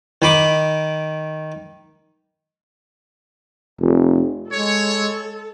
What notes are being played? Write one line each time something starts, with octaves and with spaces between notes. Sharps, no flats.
D#3 B5 D6
F1
G#3 A4 C#5